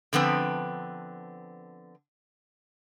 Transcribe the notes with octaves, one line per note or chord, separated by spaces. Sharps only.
D3 F3 B3 C4